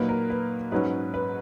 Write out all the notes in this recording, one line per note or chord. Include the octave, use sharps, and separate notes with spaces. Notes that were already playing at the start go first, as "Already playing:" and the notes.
Already playing: A#2 F#3 A#3 D#4 B4
A#4
B4
G#2 F#3 C#4 B4
B4